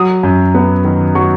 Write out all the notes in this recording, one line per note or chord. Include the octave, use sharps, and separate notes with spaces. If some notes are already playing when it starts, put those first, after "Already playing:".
Already playing: F#3 D#6
F#2
B3
D#3
F#3 C#6